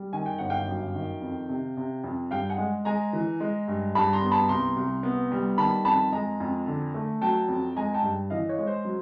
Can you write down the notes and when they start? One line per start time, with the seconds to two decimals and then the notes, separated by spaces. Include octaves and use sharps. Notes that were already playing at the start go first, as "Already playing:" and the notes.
Already playing: G3
0.13 D#3 G#5
0.26 G5
0.38 G1 F#5
0.50 F5 G5
0.67 F#2
0.95 D#3
1.22 F2
1.49 C3
1.77 C3
2.04 F2
2.31 G2 F5 G5
2.49 F#5 G#5
2.58 G#3
2.85 G#3 G#5 A#5
3.13 E3
3.40 G#3
3.68 G2
3.95 G2 A5 B5
4.13 A#5 C6
4.22 B3
4.32 A5 B5
4.49 C2 A#5 C6
4.76 C2
5.03 B3
5.32 G3
5.58 D#3 A5 B5
5.85 F2 A5 B5
6.13 G#3 G#5 A#5
6.40 F2
6.67 D3
6.94 A3
7.22 F#3 G5 A5
7.48 F2
7.76 G#3 G#5 A#5
7.94 G5 A5
8.03 G2
8.30 E3 D#5 F5
8.49 C#5 D#5
8.58 G#3
8.67 C5
8.85 F#3